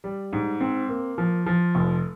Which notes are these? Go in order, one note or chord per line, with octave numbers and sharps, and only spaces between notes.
G3
G#2
C4
A#3
F3
F3
F1